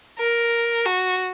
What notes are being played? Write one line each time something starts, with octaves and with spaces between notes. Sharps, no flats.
A#4
F#4